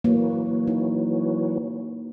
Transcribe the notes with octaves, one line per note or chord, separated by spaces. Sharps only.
E3 F#3 A#3
D#4